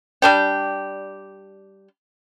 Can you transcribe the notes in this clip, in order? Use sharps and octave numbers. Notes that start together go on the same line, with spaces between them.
G3 D4 G4